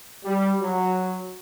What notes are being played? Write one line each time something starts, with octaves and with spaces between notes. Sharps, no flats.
G3
F#3